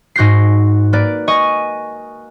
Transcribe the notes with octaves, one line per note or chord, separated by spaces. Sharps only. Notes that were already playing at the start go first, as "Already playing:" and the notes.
G#2 F#4 G6 A#6 C7
A#3 B4 D5
D#5 G#5 C#6